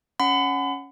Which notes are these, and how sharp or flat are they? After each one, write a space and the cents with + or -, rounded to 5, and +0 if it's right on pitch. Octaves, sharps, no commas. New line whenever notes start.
C#4 +0 F#5 +0 B5 +35